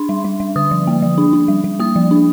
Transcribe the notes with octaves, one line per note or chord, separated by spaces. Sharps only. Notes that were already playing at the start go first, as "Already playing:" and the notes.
Already playing: D4 C6
G3
G3
G3
D3 D#6
F3
A#3
F3
D4
D4
G3
G3
A#3 D#6
F3
D4